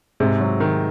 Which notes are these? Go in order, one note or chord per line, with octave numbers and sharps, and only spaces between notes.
G#2 C3 G#3
F#3
D#3